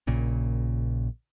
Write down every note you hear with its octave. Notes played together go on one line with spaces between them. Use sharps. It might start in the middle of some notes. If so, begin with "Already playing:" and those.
A#1 A#2 C#3